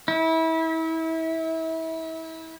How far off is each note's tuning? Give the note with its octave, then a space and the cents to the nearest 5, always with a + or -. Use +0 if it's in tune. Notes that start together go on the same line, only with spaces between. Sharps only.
E4 -30